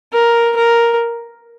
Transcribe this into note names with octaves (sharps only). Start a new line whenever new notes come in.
A#4
A#4